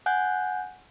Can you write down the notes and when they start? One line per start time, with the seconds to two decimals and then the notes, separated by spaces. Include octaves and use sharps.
0.06 F#5 G#5 F#6 G6